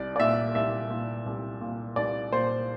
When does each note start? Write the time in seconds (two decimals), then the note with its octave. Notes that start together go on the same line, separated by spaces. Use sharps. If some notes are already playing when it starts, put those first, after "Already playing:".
Already playing: C2 D5
0.16 D5
0.19 A#2 E5
0.55 C2 E5
0.90 A#2
1.26 C2
1.61 A#2
1.96 C2 D5
2.32 A#2 C5